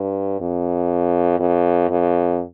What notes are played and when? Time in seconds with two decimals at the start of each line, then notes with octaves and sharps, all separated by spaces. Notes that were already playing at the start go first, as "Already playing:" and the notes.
Already playing: G2
0.40 F2
1.39 F2
1.89 F2